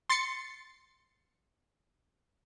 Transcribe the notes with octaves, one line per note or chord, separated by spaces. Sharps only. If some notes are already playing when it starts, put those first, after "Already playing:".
C6 A6 C7 C#7